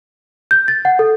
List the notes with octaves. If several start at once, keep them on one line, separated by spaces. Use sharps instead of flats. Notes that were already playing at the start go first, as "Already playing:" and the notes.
G6
A6
F#5
A4